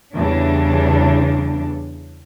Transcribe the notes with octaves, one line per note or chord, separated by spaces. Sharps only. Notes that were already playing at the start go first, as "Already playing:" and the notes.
E2 C#3 G3 D4